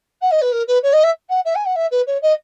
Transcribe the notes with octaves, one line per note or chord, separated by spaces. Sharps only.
F#5
D#5
B4
A#4
B4
C#5
D#5
E5
F#5
E5
G#5
F#5
E5
B4
C#5
D#5